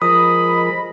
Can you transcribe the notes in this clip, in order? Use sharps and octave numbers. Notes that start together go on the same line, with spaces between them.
F3 G#3 A#4 D#5 B5 D#6